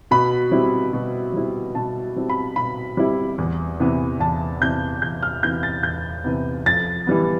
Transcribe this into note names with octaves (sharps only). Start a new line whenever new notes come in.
B2 B5
G3 C4 E4
B2
G3 C4 E4
B2 A5
G3 C4 E4
B5
B2 B5
G3 C4 E4
E2
C3 E3 B3
E2 A5
C3 E3 B3 G6
E2 G6
F6
C3 E3 B3 G6
A6
E2 G6
C3 E3 B3
F2 A6
E3 G3 B3